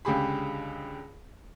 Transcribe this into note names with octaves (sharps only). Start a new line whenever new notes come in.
C#2 D3 G4 G#4 B5